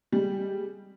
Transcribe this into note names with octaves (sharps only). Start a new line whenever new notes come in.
G3 G#3